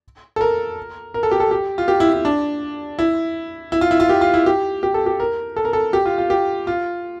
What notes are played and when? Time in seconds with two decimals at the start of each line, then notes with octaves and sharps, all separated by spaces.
0.36 A4
0.41 A#4
1.14 A#4
1.23 A4
1.31 G4
1.40 A4
1.51 G4
1.78 F4
1.88 G4
2.00 E4
2.13 E4
2.25 D4
2.99 E4
3.72 E4
3.81 F4
3.91 E4
4.00 F4
4.09 G4
4.21 F4
4.34 E4
4.46 G4
4.83 G4
4.94 A4
5.06 G4
5.20 A#4
5.56 A4
5.65 A#4
5.73 A4
5.93 G4
6.05 F4
6.18 F4
6.30 G4
6.67 F4